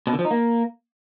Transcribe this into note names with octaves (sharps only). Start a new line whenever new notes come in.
B2
D3
F3
D#4
A#3